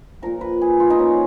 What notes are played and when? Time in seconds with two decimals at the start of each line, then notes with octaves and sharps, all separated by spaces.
0.22 A#2 F3 A#4
0.41 B4
0.61 G#4
0.80 F4
0.90 D#4
0.99 A#2 F3 C#4